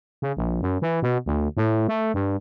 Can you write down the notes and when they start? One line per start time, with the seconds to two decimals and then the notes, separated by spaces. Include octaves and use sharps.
0.22 C#3
0.37 A#1
0.62 F#2
0.82 E3
1.02 B2
1.26 D2
1.57 A2
1.88 A3
2.14 G2